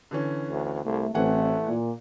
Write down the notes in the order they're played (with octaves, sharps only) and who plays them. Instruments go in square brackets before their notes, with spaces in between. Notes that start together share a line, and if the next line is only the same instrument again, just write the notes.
[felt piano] D3 E3 C#4
[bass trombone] D2
[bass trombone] C2 [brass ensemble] A3
[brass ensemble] A1 C4 [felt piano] E3 F#5 G#5 [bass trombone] A3
[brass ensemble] A#2